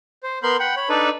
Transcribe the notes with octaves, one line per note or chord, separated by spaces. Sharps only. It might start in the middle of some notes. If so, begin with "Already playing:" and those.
C5
B3 A#4 B5 C6 G6
F#5 G5 B5
C#5 B5
D4 D#4 A4 B4 D5